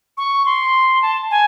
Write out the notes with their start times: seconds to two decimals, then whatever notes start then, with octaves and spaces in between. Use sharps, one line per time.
0.17 C#6
0.45 C6
1.02 A5
1.31 G#5